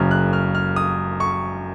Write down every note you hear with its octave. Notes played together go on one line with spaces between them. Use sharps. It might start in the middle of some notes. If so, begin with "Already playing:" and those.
Already playing: F#1 F#2 C#3 F#3 F6
F#6
F6
F6
D#6
C#6